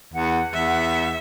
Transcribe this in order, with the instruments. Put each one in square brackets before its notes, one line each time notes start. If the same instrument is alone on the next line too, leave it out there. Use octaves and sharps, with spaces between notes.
[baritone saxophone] E2 [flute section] F#5
[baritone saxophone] E2 [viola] E5